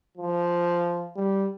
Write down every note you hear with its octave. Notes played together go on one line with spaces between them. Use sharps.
F3
G3